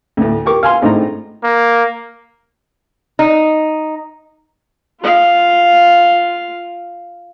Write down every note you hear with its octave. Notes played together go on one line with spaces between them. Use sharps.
D2 A2
G4 A#4 C#6 D6
F5 G#5 C6
G#1 A2 C4 D4 D#4 A#5
A#3
D#4
F4 F5